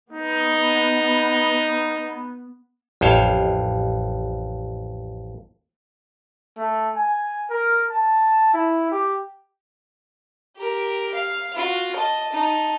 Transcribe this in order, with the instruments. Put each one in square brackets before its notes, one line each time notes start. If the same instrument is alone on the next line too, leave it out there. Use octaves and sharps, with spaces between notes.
[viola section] B3 [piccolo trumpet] D#4
[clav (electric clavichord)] A1 F2 C5 C#5 F5
[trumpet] A3
G#5
A#4
A5
E4
G4
[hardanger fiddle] G4 A#4
F5
F4 F#4
D#5 A5
D#4 A5